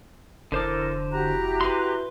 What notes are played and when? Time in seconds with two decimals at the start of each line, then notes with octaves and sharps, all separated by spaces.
0.52 F1 D3 E4 A4 A#4 C5 D6
1.12 E4 F#4 G4 A#5 F#6
1.61 B4 C6